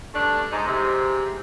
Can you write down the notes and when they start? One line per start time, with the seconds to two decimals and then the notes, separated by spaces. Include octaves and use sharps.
0.14 G2 A3 D4
0.52 G#2 D#4
0.67 G#2 C3